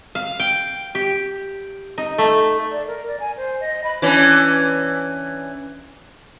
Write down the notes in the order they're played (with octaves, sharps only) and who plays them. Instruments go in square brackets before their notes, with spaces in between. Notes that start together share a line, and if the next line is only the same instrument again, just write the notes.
[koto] F5
G5
G4
D#4
A3
[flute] D5
A#4
D5
G#5
C5
D#5
B5
[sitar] E3 C#4 D4